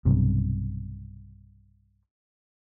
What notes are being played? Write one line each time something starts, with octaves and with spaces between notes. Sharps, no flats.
B1 G2 C3